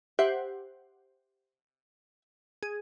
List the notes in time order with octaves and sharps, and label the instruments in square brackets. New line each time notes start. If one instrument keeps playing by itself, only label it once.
[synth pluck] G4 C5 F#5 [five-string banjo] E5
[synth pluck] G#4